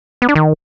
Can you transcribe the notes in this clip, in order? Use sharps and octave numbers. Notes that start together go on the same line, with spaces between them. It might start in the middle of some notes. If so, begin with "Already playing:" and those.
B3
D4
D#3